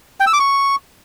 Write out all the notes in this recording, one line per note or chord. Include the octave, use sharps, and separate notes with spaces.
G5
E6
D6
C#6